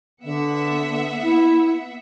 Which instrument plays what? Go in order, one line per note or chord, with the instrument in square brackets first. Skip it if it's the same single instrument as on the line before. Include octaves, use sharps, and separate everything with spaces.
[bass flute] D3 [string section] B3 E5 F#5
[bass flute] E4